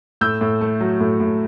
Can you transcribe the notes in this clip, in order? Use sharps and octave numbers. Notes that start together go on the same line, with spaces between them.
A2 E6 G6
A2
A3
F#3
A2
A2